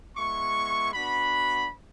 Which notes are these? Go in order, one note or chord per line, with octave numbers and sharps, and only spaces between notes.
G#3 B3 E4 C#6
B3 D4 F#4 B5